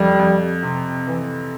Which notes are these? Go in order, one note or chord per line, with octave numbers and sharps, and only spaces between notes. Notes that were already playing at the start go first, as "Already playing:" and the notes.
Already playing: F2 G3
F2
C3
E3